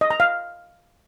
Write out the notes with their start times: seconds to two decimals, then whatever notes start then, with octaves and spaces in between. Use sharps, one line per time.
0.01 D#5
0.11 A#5
0.20 F5